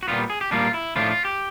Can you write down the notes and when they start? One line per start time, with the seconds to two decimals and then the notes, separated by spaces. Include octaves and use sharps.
0.03 F#4
0.08 A#2 G3 B3 F4
0.30 G#4
0.41 G4
0.51 A#2 G3 A#3 D4 F4
0.74 E4
0.96 A2 F3 A3 D4 F4
1.10 F4
1.25 G4